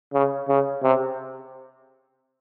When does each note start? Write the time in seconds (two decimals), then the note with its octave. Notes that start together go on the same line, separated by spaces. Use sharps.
0.13 C#3
0.48 C#3
0.82 C3